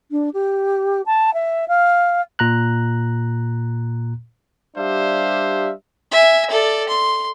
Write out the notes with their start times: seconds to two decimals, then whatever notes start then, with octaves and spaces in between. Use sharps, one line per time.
0.11 D4
0.33 G4
1.06 A5
1.34 E5
1.68 F5
2.39 A#2 A#5 F#6
4.77 G3 D4 G4 C5 E5 F5
6.11 E5 G#5
6.50 A4 D5
6.88 C6